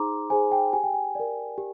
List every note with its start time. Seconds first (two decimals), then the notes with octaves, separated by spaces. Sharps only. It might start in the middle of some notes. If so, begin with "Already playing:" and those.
Already playing: D#4 G#4 C5 A#5 C6 D6
0.30 G#4 C5 G#5
0.52 G5
0.73 G4 G#5
0.84 G5
0.94 G#5
1.15 A#4 D5
1.58 G4